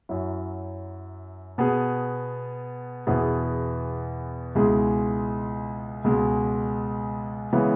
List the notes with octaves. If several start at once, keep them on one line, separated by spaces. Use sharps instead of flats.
F#2 F#3 E4
B2 B3 G#4
E2 B2 B3 E4 G#4
C#2 B2 G#3 E4 G#4
C#2 B2 G#3
C#3 E3 G#3 B3